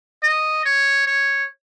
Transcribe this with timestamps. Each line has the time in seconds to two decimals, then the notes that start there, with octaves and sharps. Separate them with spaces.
0.23 D#5
0.65 C#5
1.07 C#5